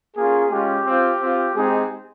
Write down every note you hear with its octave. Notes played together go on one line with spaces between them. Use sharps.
A#3 C#4 F4 G#4
G#3 C#4 F4 G4
C4 F4
C4 F4
G#3 C4 D#4 G4 G#4